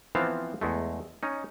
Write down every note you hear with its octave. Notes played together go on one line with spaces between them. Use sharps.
E3 F3 B3 C4 F5 A5
E2 G#3 A3
C#4 D#4